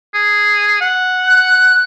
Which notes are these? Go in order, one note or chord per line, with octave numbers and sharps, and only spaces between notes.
G#4
F#5
F#6